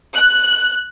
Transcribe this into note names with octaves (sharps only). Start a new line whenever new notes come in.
F#6